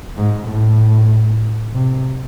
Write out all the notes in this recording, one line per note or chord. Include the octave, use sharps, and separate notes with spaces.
G#2
A2
C3